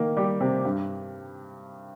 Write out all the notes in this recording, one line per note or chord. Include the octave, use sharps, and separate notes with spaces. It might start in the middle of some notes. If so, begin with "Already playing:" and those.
Already playing: D#3 A#3
G3 G4
C3
G2